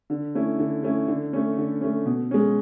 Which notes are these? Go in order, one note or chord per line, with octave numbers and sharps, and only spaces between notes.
D3
A3 C#4 E4
D3
A3 C#4 E4
D3
A3 C#4
D3
A3 C#4
B2
G#3 C#4